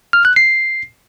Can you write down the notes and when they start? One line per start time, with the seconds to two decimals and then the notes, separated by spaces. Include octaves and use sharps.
0.13 F6
0.25 F#6
0.36 C7